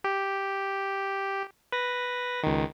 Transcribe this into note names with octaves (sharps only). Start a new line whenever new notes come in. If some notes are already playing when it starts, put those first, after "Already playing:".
G4
B4 A#6
C#2 D#3